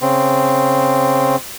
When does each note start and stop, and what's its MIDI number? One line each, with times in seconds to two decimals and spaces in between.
0.01 1.36 49
0.01 1.36 60